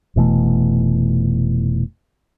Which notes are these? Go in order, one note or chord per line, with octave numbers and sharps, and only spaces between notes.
F1 B2 E3 A3